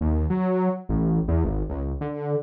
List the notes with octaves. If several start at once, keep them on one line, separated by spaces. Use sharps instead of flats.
D#2
F#3
A1
E2
G#1
C#2
D3